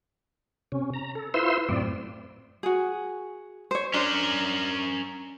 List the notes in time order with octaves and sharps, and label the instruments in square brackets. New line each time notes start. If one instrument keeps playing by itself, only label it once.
[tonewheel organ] C3 C#4
A#5
A4
E4 F4 B4 C5 C6 E6
F#2 A2 C4 D5
[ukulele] F#4 G#4
C5 C#5
[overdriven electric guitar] C#4 A#4 [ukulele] D4 C5